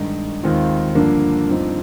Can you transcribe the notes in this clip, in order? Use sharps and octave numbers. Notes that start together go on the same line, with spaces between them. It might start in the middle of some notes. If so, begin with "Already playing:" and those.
Already playing: G2 D#3 G#3 D#4
D#2 D#3 G#3 C4 F4
G2 D3 F3 A#3 D4
G2 F3 C4 D#4